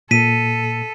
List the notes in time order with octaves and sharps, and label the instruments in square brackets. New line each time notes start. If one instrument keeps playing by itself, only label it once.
[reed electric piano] A#2 [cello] A4 [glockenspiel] B6 D#7